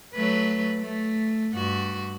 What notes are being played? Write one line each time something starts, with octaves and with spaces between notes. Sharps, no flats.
F#3 A3 B4
A3
G2 F#4